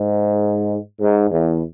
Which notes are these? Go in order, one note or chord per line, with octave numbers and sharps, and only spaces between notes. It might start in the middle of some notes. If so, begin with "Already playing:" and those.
Already playing: G#2
G#2
E2